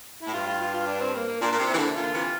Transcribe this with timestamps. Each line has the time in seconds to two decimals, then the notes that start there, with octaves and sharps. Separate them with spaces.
0.23 A2 E4
0.33 G2 F4
0.46 F4
0.61 F4
0.74 F4
0.87 D4
1.00 C4
1.15 A#3
1.27 A#3
1.41 A#2 D4
1.52 A#2
1.59 C3
1.68 E3 C4 E4
1.77 A#2 D3
1.95 A#2 D3 F4
2.14 C3 E3